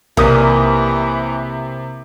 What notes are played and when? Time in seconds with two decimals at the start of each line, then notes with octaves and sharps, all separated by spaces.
0.17 B1 C3 E3 A#3 D5 C6 D#6